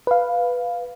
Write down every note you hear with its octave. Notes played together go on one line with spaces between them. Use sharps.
B4 F5